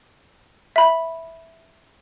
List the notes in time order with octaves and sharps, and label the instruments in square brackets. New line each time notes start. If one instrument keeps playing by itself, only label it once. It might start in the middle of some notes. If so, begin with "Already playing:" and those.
[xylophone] E5 B5